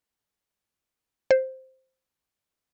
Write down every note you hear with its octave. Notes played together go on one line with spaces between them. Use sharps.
C5